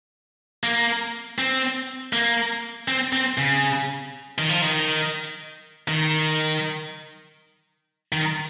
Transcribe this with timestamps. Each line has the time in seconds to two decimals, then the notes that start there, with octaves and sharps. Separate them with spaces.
0.64 A#3
1.38 C4
2.13 A#3
2.88 C4
3.13 C4
3.38 C#3
4.38 D#3
4.49 F3
4.62 D#3
5.88 D#3
8.12 D#3